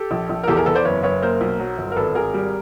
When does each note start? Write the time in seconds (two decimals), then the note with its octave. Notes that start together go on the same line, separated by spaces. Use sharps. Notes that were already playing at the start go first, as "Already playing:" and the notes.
Already playing: G4 A4
0.11 A#1
0.29 A#1
0.43 A#4
0.48 E2 G4 A4
0.57 G#4 A#4
0.66 E2 A4 B4
0.75 C5 D5
0.85 F#1 B4 C#5
1.03 F#1 B4 C#5
1.22 A#3 A#4 C5
1.41 B1
1.59 F#3
1.78 G1
1.92 A#4
1.96 G#1 A4 B4
2.15 G#1 G#4 A#4
2.34 G3